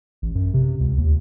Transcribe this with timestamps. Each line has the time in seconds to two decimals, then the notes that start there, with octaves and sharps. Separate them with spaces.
0.22 A1
0.35 F#2
0.54 C3
0.80 C#2
0.98 D#2